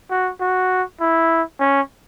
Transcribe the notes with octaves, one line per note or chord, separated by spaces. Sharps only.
F#4
F#4
E4
C#4